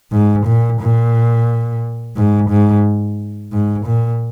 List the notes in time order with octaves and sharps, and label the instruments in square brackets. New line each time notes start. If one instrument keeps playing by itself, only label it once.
[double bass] G#2
A#2
A#2
G#2
G#2
G#2
A#2